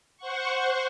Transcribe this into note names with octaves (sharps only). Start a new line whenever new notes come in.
C5 F#5 C#6